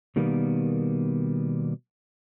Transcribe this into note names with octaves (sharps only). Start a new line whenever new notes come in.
B2 D#3 G3 A#3 B3